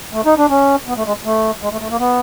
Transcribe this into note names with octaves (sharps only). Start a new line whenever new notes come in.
A3
D#4
D4
C#4
B3
A3
G#3
A3
G#3
A3
A3
A#3
B3